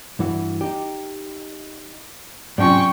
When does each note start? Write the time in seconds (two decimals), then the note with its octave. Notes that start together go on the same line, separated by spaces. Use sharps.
0.19 G2 E3 F#4
0.61 D#4 G4
2.58 G#2 C3 F#3 C#4 F4 G5 G#5 C#6